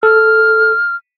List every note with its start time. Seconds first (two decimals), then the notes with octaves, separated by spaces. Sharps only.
0.03 A4 F6